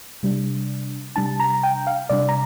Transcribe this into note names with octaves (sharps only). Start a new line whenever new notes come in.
C3 G3 D4
C3 G3 D4 A5
A#5
G5
F5
C3 G3 D4 D5
A#5